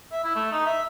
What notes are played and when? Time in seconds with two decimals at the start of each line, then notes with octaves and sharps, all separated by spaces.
0.12 E5
0.24 E4
0.36 A3
0.52 D#4
0.66 E5